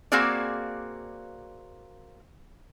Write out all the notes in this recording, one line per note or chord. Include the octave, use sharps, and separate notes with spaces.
A#3 C4 F#4 G#4 D5